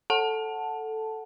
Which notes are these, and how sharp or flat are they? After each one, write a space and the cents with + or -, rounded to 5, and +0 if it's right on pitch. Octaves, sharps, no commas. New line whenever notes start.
A4 +0 F#5 +0 A5 +0